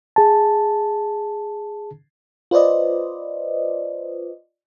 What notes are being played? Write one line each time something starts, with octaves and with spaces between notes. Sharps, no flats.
G#4 A5
F4 B4 C5 D5 D#5